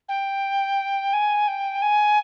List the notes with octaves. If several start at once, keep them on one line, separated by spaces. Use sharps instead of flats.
G5
G#5
G5
G#5